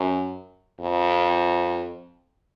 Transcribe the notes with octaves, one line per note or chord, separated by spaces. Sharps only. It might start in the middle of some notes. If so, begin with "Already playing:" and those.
Already playing: F#2
F2